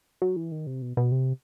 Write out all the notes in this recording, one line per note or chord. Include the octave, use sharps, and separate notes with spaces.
F#3
E3
D#3
C3
B2
B2
C3